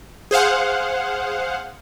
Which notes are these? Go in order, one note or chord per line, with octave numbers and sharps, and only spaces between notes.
G#4 C5 F5 F#5